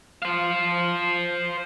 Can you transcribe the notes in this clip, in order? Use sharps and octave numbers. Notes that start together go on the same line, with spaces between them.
C5 F5